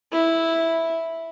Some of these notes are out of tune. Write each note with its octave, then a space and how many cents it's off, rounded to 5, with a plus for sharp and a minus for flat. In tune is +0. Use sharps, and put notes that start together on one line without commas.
E4 -5